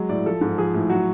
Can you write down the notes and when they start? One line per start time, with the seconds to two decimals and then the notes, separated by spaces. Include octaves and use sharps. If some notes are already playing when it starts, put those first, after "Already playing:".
Already playing: F#3 G#3
0.09 A2 D5
0.26 F3 A4
0.41 G#2
0.58 F3 G#4
0.74 A2
0.89 F#3 F#4